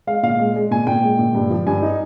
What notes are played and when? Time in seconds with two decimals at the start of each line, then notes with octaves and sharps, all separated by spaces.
0.07 G#3 F5
0.23 A#2 F5
0.39 G#3
0.56 G#3
0.71 A#2 G#5
0.87 A#2 G5
1.03 G#3
1.19 A#2
1.35 G2
1.50 F3
1.66 G2 G#5
1.82 D#4